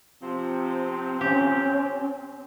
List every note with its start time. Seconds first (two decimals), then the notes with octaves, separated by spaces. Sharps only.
0.22 C3 F3 C4
1.21 C#4 G4